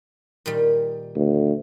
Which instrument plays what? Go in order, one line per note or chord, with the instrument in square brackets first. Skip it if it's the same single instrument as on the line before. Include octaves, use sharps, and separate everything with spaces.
[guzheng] A#2 D#3 G3
[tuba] D2